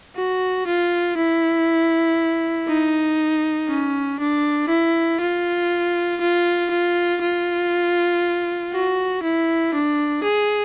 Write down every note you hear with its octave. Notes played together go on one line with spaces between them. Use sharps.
F#4
F4
E4
D#4
C#4
D4
E4
F4
F4
F4
F4
F#4
E4
D4
G#4